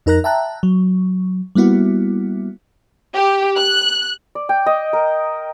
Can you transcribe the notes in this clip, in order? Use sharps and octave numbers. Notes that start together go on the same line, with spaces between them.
F2 D#4 A#4 A#5 F#6 A#6
E5 G5 A5 A#5 F#6
F#3
G3 A#3 B3 E4 F#4
G4
F#6
D5
G5
D#5
A#4